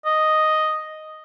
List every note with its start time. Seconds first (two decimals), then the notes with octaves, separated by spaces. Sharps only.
0.06 D#5